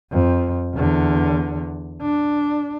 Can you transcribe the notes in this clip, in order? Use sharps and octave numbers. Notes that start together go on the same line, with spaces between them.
F2
E2 D3
D4